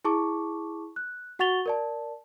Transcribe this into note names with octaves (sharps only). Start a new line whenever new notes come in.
E4 G#4 A5 C#6 D6
F#6
F#4 F#5 C#6 A6 F7 G7
A#4 D5 A5